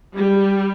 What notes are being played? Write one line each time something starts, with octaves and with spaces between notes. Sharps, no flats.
G3